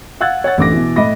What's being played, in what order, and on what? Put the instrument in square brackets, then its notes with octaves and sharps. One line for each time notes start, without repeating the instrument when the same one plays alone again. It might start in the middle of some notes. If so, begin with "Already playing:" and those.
[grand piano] F5 F#5 E6 F#6 G#6 A6
C#5 F#5 A6
A1 D3 D6 A#6
B2 E3
A2 D#5 E5 B5 D6 A#6